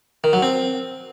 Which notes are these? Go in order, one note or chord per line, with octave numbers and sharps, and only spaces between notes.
D#3
F#3
C4